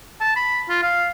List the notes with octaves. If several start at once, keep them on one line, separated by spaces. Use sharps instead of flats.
A5
B5
F4
F5